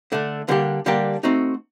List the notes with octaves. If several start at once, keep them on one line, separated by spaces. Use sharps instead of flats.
D3 A3 D4
D3 G3 A#3 D4 G4
D3 G3 A#3 D4 G4
A3 C4 D#4 F#4